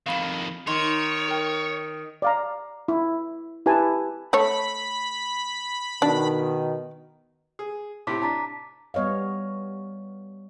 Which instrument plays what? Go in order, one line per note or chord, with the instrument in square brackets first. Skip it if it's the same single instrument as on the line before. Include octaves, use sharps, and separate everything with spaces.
[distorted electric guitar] F2 D#3 [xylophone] F5 B5 E7
[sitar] D#3 [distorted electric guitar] C#5 [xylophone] C6
[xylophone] A#4 G5
[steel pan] D5 F5 A#5
E4
E4 G4 B4 G#5 A5
[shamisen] A3 A4 C#5 [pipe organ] B5
[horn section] B2 D#3 [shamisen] D4
[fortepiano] G#4
[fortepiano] A2 C3 [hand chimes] D6 B6
[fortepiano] D4 [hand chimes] A5 A#5 B6
[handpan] G3 B3 C#5 D#5 F5